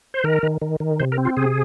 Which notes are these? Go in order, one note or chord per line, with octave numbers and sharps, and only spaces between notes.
C5
D#3 A#4
D#3
D#3
D#3
C3 C5
A#4
C4
F4
C3 G#4